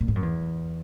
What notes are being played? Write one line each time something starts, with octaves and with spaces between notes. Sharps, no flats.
A#2
G#2
F#2
E2